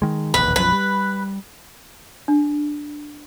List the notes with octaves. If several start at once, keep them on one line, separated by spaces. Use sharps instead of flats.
D#3 G#3
E1 A#1 D#2 B4
B1 F#2 F3 B4
G3
D4